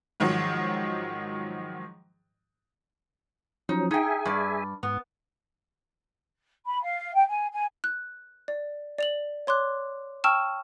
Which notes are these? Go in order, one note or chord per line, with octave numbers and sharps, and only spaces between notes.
G#2 D#3 F3 F#3
F3 F#3 C#4 D#4
D#4 G#4 E5 G5 G#5
G2 D5
G#2 B3
B5
F5
G5
G#5
G#5
F#6
D5
D5 F7 F#7
C#5 C6 D6 F#6
G5 A5 C#6 E6 F6 E7